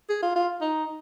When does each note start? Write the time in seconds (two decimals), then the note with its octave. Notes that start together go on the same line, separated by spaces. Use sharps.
0.10 G#4
0.22 F4
0.36 F4
0.61 D#4